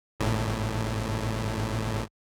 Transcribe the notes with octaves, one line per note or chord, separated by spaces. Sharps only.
G#1 A2